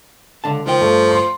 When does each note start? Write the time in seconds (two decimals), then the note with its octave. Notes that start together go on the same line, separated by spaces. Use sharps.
0.44 C#2 D3 A5
0.66 C#2 D#3 F3 G5
0.81 G2 A3
1.11 C6